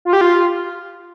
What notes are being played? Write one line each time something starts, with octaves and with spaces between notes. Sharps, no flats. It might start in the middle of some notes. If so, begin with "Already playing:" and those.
F4
G4
F4